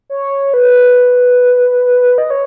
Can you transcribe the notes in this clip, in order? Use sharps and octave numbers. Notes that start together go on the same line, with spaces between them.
C#5
B4
D#5
C#5